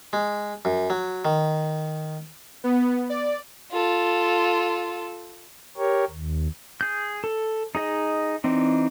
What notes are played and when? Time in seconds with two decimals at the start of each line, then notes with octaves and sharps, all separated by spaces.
0.13 G#3
0.65 F#2
0.90 F#3
1.25 D#3
2.64 B3
3.10 D5
3.72 F4 A4
5.77 G4 A#4 C#5
6.10 D#2
6.81 G#4 G6
7.24 A4
7.75 D#4 G#4 D#5
8.44 E3 C4 D4 D#4